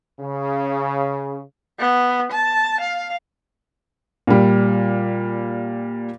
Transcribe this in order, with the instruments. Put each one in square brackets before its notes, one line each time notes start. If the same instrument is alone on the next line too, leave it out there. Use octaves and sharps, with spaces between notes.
[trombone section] C#3
[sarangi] B3
A5
F5
[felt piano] A#2 G3